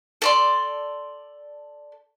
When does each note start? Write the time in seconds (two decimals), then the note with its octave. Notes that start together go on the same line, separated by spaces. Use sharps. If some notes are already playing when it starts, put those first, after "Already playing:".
0.22 A4 D5 C6